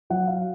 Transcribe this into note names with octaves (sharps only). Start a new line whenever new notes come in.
F#3 F#5
F5